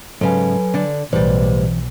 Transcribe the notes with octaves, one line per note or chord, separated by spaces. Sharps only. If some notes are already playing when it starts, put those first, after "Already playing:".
G#2 C#3 F#3 A4 B4 G#5
D3 D4
B1 A2 E3 G3 B4 C5 D5